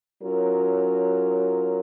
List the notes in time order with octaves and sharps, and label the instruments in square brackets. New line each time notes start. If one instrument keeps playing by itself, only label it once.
[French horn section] F#3 C#4 F4 A#4